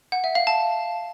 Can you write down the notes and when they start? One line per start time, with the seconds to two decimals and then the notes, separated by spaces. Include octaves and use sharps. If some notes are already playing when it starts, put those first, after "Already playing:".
0.12 F#5
0.24 E5
0.35 F5
0.47 A5